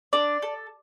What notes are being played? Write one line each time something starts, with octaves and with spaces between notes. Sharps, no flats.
D4 D5
A4